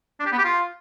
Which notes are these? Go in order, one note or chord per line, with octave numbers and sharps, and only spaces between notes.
D4
G4
B3
G4
F4